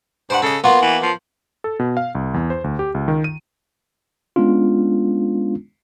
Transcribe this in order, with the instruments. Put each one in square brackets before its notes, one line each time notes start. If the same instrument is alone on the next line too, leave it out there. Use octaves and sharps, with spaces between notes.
[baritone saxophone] G2 [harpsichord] C5 F#5
[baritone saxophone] C#3 [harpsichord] A4 D#5
[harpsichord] A#3 B3 F#4 [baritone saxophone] F4
[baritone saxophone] E3
F3
[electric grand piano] A4
B2
F5
C2
E2
C5
D2
G4
C#2
D#3
D#7
[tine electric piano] G#3 B3 C#4 D4 F4